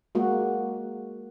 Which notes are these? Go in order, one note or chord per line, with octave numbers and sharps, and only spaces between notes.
G#3 A#3 F#4